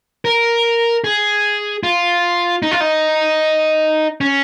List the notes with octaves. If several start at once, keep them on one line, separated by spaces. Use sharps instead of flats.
A#4
G#4
F4
D#4
F4
D#4
C#4